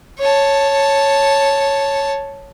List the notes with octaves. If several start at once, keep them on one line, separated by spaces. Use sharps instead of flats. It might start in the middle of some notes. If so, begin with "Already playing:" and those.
C#5 A5